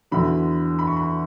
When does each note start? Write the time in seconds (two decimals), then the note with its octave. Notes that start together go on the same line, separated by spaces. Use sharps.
0.11 E2 D3 F#3 B5
0.79 B5
0.87 C#6
0.97 B5